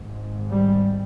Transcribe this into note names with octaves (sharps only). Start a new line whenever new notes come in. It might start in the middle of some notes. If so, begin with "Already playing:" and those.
Already playing: G#1 G#2
G3